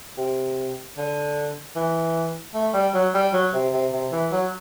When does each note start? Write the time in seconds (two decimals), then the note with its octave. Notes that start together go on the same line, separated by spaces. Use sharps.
0.18 C3
0.97 D3
1.76 E3
2.54 A3
2.74 G3
2.94 F#3
3.14 G3
3.33 F#3
3.53 C3
3.73 C3
3.93 C3
4.12 E3
4.32 F#3